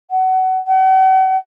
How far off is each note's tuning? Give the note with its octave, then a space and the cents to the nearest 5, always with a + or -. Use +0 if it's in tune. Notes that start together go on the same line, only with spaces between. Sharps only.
F#5 +25
F#5 +40